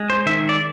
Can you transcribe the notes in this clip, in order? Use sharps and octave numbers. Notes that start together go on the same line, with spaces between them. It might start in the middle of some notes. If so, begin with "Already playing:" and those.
Already playing: G#3
C5
D#3 E5
D5